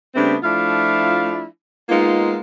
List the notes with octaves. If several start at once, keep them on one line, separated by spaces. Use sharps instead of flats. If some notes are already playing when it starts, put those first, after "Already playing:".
C#3 G3 A3 B3 C4 D4
F3 A3 D4 E4 F4 F5
G#3 A#3 B3 D#4 F4